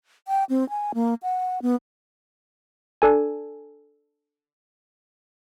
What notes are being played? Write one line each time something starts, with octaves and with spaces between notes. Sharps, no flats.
G5
C4
G#5
A#3
F#5
B3
D4 A4 G#5